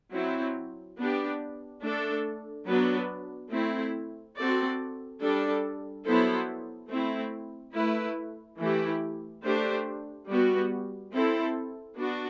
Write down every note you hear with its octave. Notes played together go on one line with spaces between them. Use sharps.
F#3 C4 E4
B3 D4 G4
A3 D4 A4
F#3 B3 D4 F#4 B4
A3 C4 E4
C4 F#4 A4 D5
G3 D4 A4
F#3 B3 E4 A4 C5
A3 C4 E4
A3 E4 B4
E3 A3 E4 G4
A3 D4 G4 C5
G3 B3 F#4
C4 E4 A4
B3 D4 F#4